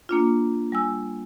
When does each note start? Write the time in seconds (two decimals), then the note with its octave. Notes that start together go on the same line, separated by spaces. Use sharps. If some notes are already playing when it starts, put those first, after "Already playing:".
0.09 A#3 D4 F4
0.72 G3 G#5 E6